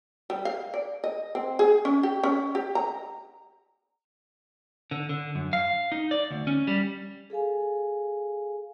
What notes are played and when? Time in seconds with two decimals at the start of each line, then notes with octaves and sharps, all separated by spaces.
0.30 G3
0.45 F5
0.74 D5
1.04 D#5
1.35 C4
1.59 G#4
1.85 C#4
2.03 G4
2.23 C#4
2.55 G4
2.75 A#5
4.91 D3
5.09 D3
5.35 F#2
5.53 F5
5.92 D#4
6.11 D5
6.31 D2
6.47 C#4
6.67 G3
7.30 G#4 A4 F5 G#5